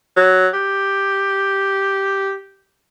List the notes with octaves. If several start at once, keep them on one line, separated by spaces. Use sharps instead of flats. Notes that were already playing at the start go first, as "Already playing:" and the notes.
F#3
G4